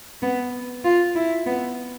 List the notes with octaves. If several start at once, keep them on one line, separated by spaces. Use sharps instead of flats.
B3
F4
E4
B3